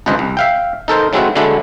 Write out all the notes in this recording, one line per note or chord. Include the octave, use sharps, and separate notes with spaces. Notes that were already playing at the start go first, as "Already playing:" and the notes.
G#1 C#2 G2 B4 C5 D#5
C2
E5 F5 G5
D#4 A4 A#4 C5
A2 F#3 G#3 C4 E4 F#4
D3 F#3 G#3 A3 D4 E4